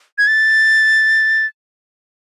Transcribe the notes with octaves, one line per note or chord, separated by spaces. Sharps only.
G#6
A6